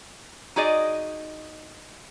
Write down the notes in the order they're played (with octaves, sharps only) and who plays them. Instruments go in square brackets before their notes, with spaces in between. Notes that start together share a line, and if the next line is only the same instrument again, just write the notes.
[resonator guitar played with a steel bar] D#4 F#4 G#4 D5 D#5